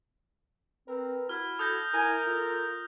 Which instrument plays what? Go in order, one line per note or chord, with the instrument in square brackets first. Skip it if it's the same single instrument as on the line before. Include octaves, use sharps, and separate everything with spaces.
[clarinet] C4 [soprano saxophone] A#4 [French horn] B4
[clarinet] E4 [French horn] F#4 [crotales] F6
[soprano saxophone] A4 [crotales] D#6 G6 A#6
[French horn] E4 [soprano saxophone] A#4 [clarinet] G#5
[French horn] F4 [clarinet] A4